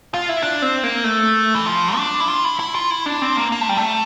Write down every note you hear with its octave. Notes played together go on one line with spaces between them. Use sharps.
F4
E4
D4
C4
A#3
A3
E3
F3
D4
E4
F4
E4
E4
F4
E4
D4
C4
A#3
A#3
A3
G3
A3